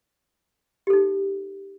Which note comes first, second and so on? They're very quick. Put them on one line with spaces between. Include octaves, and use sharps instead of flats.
G4 A4 D#4